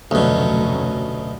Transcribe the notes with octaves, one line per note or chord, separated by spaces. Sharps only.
F1 D2 B2 F#3 C#4